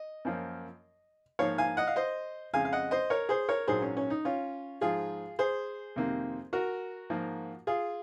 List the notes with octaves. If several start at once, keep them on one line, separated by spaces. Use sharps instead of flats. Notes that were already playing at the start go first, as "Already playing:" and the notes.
Already playing: D#5
F#2 F3 A#3
G#2 F3 A#3 C#5 F5
F5 G#5
D#5 F#5
F5
C5 D#5
F2 C#3 G#3 F5 G#5
F5
D#5 F#5
C5 D#5
A#4 C#5
G#4 C5
A#4 C#5
A#1 G#2 F#3 G#4 C5
C#4
C#4
D#4
C#4 F4
G#2 F3 G#3 F4 G#4
G#4 C5
F2 C3 D#3 A#3
F#4 A#4
G#2 F3 A#3
F4 G#4